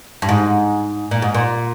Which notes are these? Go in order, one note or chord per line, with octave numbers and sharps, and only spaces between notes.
G2
G#2
A#2
G#2
A#2